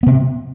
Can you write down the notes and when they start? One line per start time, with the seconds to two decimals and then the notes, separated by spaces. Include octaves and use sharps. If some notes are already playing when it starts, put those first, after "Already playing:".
0.03 B3
0.06 C3